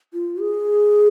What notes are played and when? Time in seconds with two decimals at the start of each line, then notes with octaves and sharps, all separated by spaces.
0.13 F4
0.41 G#4